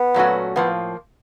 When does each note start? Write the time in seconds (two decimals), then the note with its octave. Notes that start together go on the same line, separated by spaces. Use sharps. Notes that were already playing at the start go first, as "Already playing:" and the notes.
Already playing: B3
0.14 A#2 F#3 A3 C#4 F#4
0.56 A2 F3 A#3 B3